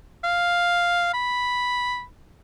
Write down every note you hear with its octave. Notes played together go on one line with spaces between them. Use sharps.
F5
B5